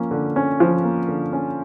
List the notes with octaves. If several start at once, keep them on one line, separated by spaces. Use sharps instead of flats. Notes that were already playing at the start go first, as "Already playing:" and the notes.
Already playing: F3 A#3 C#4
D3
C#4
F3
A#3
D3
C#4